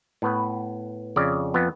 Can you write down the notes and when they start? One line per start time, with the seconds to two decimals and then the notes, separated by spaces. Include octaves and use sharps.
0.22 A2 B3 B4
1.16 F2 C#3 D5
1.54 F2 B3